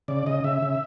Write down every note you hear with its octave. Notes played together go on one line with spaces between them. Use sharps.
C#3 D5
C#3 D#5
C#3 E5
C#3